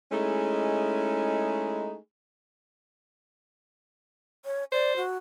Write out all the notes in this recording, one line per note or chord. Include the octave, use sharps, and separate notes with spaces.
G#3 A3 C#4 D#4 E4 G#4
C#5
C5 D5
F#4